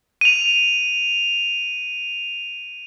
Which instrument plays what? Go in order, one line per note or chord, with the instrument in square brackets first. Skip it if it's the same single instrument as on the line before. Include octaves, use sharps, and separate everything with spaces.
[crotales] D#7 F7